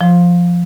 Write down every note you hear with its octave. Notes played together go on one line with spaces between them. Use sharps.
F3